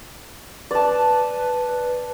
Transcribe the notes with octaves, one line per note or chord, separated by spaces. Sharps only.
B4 D5 A5